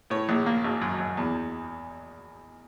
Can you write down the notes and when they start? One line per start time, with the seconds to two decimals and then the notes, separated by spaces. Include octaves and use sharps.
0.10 A2 C#5
0.29 A#1
0.46 A#3
0.64 G#1
0.82 F#2
0.99 F#2
1.17 E2